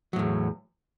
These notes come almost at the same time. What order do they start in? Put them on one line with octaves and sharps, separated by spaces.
F#3 A2 E2